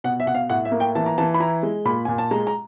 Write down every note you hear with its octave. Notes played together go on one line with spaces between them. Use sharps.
B2 F#5
E5
B2 F#5
F5
A2 F#5
E5
A#3
G5
E3 A5
A#5
E3 A5
B5
E4 A#5
G#3
A#2 B5
A#2 G#5
A5
G#3 A#5
A#5